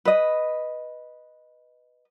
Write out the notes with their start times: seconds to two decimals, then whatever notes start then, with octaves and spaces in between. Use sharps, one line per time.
0.05 B4 D#5